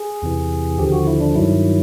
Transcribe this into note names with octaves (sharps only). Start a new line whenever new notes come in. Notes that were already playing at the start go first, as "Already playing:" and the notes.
Already playing: G#4
E2 C3 E3
D#2 D3 F3 G4
F#4
E4
D4
G2 D#3 F#3 E4